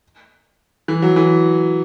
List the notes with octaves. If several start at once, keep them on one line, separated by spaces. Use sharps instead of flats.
E3
F#3
E3